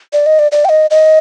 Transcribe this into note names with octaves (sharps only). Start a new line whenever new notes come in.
D5
D#5
D5
D5
G5
D#5
D#5